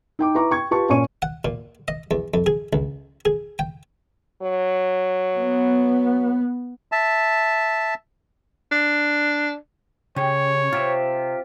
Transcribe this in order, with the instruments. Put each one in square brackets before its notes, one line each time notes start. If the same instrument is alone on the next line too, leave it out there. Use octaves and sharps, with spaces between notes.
[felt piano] D#4 G5 D6
E4 B4 A#5 C#6 D6
G5 C#6 G#6
F4 G4 B4 A5 C#6
A#2 C#4 C#5 C#6 D#7
[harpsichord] F#5
A#2
D#5
E2
F2
G#4
C#2
G#4
G5
[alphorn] F#3
[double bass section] B3
[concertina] E5 A5
[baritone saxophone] D4
[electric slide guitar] C#3 [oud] G4 [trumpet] C#5
[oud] C3 [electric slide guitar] F4 G4 E5